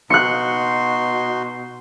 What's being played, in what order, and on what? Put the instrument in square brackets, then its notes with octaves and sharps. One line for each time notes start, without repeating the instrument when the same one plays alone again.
[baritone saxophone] B2 [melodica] D#4 F#4 C6 [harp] F#6 C#7